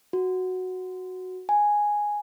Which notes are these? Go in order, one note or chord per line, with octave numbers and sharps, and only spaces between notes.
F#4
G#5